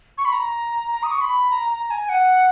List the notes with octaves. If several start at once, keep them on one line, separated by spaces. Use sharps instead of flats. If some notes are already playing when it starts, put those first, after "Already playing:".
C#6
B5
A#5
A#5
D#6
C#6
B5
A#5
A#5
G#5
F#5